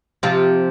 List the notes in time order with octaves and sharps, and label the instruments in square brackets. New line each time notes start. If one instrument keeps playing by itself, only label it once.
[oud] C3 F3